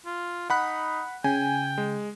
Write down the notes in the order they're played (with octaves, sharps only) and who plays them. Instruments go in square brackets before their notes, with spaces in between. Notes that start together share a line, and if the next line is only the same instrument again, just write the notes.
[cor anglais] F4
[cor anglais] D#4 [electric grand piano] F#5 B5 F#6
[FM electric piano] C#3 [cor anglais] G5 [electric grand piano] G#5
[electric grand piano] G#3